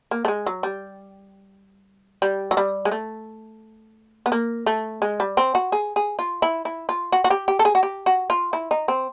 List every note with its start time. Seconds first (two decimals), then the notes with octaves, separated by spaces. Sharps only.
0.11 A#3
0.25 A3
0.28 G#3
0.46 F#3
0.63 G3
2.22 G3
2.51 F#3
2.57 G3
2.85 G#3
2.91 A3
4.26 B3
4.32 A#3
4.66 A3
5.02 G#3
5.20 G3
5.37 C4
5.55 F#4
5.72 G#4
5.96 G#4
6.19 F4
6.42 E4
6.65 E4
6.89 F4
7.12 F#4
7.24 F#4
7.30 G4
7.48 G4
7.59 A4
7.65 G#4
7.75 F#4
7.83 G4
8.06 F#4
8.30 F4
8.53 E4
8.71 D#4
8.88 C4